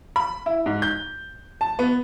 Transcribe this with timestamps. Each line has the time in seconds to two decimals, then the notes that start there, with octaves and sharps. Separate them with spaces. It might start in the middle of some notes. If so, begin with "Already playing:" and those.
0.16 B5
0.46 E4
0.66 G#2
0.82 G6
1.61 A5
1.79 B3